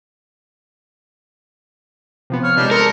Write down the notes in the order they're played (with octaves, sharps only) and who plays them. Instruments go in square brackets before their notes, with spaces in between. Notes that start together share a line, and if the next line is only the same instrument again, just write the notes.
[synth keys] C3 F3 B3
[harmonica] C#5 [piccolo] F6
[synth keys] C3 G#3 [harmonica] G3 D4 D#4
[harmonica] A4 C5 A5 [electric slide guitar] A#4 [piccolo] C#7